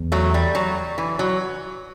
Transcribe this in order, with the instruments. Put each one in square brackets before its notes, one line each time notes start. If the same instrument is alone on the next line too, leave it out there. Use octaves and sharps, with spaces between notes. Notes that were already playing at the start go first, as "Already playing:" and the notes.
Already playing: [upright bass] E2
[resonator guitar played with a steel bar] F#3 A3
G3
F#3
E3
F#3